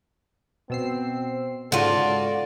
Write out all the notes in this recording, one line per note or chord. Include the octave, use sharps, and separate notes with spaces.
B2 C4 E6 C7
G#2 C#3 F4 F#4 A4 D5